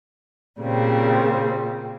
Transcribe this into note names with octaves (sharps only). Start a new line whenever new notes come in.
A#2 C#3 G3 C4